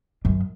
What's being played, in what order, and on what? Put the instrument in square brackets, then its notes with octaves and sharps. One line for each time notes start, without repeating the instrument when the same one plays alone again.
[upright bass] F#2